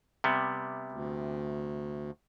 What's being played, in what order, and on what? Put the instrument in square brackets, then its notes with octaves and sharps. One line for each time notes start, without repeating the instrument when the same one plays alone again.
[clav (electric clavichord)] C3 G3 B3
[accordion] D2